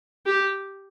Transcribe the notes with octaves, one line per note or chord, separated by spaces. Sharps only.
G4